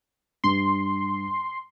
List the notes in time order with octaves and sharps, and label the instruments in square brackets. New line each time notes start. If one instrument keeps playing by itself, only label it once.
[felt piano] G2 [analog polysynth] C6